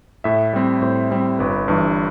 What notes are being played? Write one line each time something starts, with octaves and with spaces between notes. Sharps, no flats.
A2 E5
G3 C4
A2 C5
G3 C4
G1 B4
G2 E3